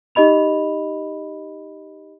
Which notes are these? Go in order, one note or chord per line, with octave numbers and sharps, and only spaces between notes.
D#4 G4 D#5 B5 F7